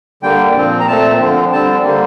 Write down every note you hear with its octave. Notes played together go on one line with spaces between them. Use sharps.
D3 G3 A#3 G5
A#2 F3 C4
A#5
A#2 A3 C4 A5
D3 F3 C4
D3 G3 C4 A5
D3 G3 A#3